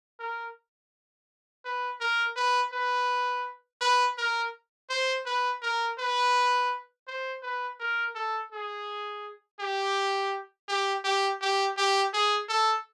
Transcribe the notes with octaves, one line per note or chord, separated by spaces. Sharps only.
A#4
B4
A#4
B4
B4
B4
A#4
C5
B4
A#4
B4
C5
B4
A#4
A4
G#4
G4
G4
G4
G4
G4
G#4
A4